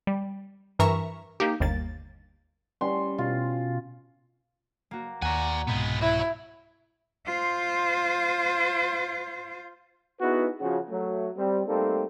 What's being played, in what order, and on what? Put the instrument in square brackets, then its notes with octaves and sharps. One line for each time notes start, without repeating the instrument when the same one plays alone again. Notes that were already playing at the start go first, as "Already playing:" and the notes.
[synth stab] G3
G2 E3 A#4 E5 A#5 C#6
A#3 D#4 G4
G1 D#2 A#3 A6
[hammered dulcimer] G3 C#4 C6
[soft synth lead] B2 [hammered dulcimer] F4
[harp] A#3 F#4
[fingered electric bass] D#2 [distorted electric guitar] D5 G#5 [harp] F#5 A#5 C#6
[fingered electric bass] C2 G#2 B2 [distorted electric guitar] G#3 B3 [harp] B5 G6
[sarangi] E4 [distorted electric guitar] F#4 C#5
[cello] F4 C5
[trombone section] B3 D#4 E4 F#4 G#4 B4
C#3 F3 F#4
F#3 A3
G3 C4
G3 A3 A#3 C4 D#4 A4